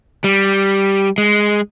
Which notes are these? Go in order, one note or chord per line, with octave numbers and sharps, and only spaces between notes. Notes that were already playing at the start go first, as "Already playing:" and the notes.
G3
G#3